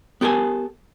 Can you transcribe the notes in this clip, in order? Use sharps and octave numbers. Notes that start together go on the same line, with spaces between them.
B3 G4 A4 A#4 G#5